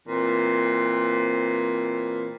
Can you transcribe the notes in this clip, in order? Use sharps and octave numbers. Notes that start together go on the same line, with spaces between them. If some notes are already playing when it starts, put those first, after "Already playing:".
A#2 E3 C4